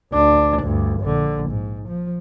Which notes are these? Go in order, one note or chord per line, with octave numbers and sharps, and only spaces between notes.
D2 D4
D2 G2
A#1 D3
G#2
F3